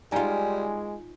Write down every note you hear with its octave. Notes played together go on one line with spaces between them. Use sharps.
G3 G#3 D#4 F4 G#5